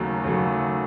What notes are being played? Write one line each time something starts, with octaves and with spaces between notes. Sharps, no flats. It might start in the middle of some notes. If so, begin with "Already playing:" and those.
Already playing: D#2 C#3 F#3 A3
D#2 C#3 F#3 A3